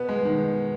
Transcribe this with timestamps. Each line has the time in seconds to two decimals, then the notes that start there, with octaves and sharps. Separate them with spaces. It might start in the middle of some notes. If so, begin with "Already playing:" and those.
Already playing: B2 B3
0.09 G#3
0.25 D#3